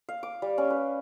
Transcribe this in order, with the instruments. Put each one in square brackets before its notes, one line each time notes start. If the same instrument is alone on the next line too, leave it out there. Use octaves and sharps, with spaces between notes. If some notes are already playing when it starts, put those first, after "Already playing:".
[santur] F5
D6
G3
C#4
B4